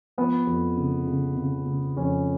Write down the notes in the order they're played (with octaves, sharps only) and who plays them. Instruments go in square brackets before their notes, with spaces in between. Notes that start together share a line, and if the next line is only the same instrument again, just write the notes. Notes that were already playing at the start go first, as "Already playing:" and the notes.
[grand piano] F3 B3
F2
C#3
C#3
C#3
C#3
F2 C#4